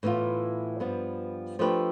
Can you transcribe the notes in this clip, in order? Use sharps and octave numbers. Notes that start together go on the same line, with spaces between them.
A2 E3 B3 F4
G2 F3 B3
F3 A3 D4 G4 B4